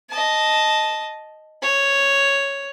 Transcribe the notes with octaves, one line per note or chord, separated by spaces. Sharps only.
D#5 A5
C#5